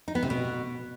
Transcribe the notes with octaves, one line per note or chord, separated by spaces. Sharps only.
D#4
B3
C3
B2